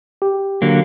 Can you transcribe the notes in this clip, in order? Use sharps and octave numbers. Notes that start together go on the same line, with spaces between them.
G4
D3 F#3 A#3